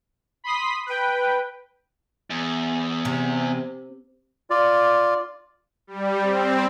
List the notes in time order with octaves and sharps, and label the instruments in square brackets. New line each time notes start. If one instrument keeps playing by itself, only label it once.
[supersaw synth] B5 C6 D#6 B6
B4 G5
[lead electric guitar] E2
[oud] C3
[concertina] F4 D5
[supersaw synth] G3
C4